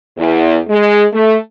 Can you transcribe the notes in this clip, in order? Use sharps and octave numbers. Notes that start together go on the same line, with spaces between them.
E2
G#3
A3